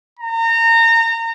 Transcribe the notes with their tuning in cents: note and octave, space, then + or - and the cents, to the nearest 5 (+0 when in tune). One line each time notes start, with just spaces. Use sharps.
A#5 -30